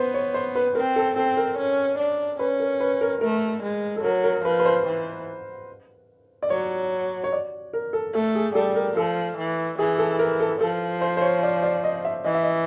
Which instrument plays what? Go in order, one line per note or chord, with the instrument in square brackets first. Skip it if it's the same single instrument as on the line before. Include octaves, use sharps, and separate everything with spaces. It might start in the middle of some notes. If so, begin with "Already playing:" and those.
Already playing: [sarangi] B3 [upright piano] B4 C5
[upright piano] C#5
C5
B4
[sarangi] C4 [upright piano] A#4
[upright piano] A4
[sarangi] C4 [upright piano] A4
[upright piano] A#4
[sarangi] C#4
D4
[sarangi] C#4 [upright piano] B4
[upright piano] A#4
B4
A#4
[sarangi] A3 [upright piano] A#4
[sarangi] G#3
[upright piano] A4
[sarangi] F#3 [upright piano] A#4
[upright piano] A#4
[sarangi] F3 [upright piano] B4
[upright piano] B4
C5
[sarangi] E3
[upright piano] D5
[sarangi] F#3 [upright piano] C#5
[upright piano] C#5
D5
A#4
A4
[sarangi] A3 [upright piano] A4
[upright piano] G#4
[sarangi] G3 [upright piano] A4
[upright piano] A#4
[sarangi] F3 [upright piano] A4
[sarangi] E3
[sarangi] E3 [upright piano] G#4
[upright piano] A4
A#4
A4
[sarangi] F3 [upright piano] A4
[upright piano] C5
C5
C#5
D5
D5
D#5
E5
[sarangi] E3 [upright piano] D#5
[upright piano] E5
D#5